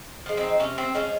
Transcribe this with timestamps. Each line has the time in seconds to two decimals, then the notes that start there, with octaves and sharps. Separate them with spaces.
0.26 F3 G#3
0.37 C4 D#4
0.60 C3 C#4
0.78 C4
0.95 F3 G#3 C#4